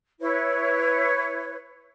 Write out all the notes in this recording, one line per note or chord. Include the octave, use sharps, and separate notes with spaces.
E4 B4 C#5